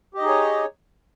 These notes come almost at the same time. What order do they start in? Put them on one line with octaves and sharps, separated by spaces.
G4 D#5 D#4 G#4 C#5